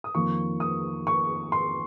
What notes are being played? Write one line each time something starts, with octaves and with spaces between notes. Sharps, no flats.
D#6
F2 D#3 A#3 F4 C#6
D#6
C#6
C6